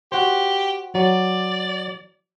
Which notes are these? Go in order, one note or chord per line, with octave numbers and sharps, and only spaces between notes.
F#4 G4 C5
F#3 D5